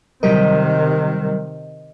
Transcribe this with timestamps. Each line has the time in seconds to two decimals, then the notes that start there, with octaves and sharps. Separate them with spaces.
0.23 C3 D#3 F#3 G3 A#4 D#5 G6 B6